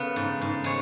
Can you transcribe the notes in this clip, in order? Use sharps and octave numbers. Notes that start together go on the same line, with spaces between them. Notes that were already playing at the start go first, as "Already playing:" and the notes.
Already playing: C#3 B3 A4
G#2
G#2
G#3 C#5